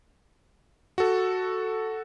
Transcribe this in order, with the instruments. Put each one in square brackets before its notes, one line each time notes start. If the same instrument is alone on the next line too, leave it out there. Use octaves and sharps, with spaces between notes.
[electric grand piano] F#4 A4